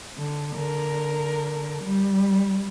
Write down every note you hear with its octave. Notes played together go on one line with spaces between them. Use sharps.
D3
D3 A#4
G3